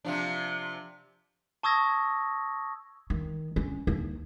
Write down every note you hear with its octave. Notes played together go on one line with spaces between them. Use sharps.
C3 F3 D4
A5 C#6 D#6 E6 G#6 A#6
D#3
C#4
D#2